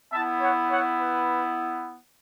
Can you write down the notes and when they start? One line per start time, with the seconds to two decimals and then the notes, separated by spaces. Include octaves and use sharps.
0.12 B3 E4 E5 A5
0.41 C#5 F#5
0.70 C#5 F#5
0.99 B4